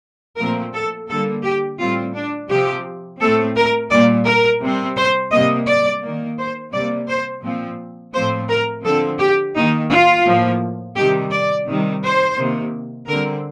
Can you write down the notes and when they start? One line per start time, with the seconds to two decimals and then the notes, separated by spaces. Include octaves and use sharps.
0.37 A#2 F3 A3 C4 A#4
0.73 A4
1.08 D3 G3 A#3 A4
1.43 G4
1.79 A2 G3 C4 F4
2.14 D4
2.49 C3 F3 C4 G4
3.20 A2 A3 C4 A4
3.56 A#4
3.91 A#2 G3 A#3 D5
4.26 A#4
4.62 C3 G3 C4
4.97 C5
5.32 C3 G3 A#3 D#5
5.66 D5
6.02 D#3 A#3
6.38 C5
6.74 C3 G3 A#3 D5
7.08 C5
7.44 A#2 F3 C4
8.13 A2 F3 A3 C4 C5
8.49 A#4
8.85 D3 F3 C4 A4
9.19 G4
9.55 D#3 A#3 D#4
9.90 F4
10.25 A2 F3 A#3
10.96 C3 D#3 G3 G4
11.31 D5
11.66 C3 D#3 G3
12.03 C5
12.37 C3 D#3 A#3
13.07 D3 G3 C4 A#4